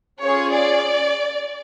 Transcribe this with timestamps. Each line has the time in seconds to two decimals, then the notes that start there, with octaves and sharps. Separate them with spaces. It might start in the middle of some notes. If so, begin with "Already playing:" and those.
0.22 C#4 F4 G#4 C#5
0.53 D5